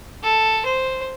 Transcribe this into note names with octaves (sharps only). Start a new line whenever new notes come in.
A4
C5